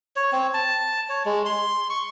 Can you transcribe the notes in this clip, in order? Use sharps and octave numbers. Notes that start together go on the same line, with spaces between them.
C#5
C4
A5
C#5
G#3
C6
C#6